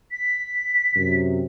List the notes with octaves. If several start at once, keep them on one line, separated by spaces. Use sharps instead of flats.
B6
F#2 C3